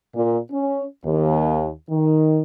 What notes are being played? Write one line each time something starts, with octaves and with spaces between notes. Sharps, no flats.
A#2
C#4
D#2
D#3